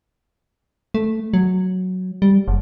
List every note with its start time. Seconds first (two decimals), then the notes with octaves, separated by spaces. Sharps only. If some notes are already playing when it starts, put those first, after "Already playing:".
0.94 A3
1.34 F#3
2.22 G3
2.48 F#1